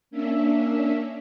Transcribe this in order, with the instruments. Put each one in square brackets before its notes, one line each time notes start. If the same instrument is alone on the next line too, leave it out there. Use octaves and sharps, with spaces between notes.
[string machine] A#3 C#4 D4 E5